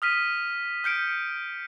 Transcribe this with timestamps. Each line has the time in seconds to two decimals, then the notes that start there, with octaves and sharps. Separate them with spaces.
0.02 D#6 F6 B6 D#7
0.84 F6 G6 C#7 D7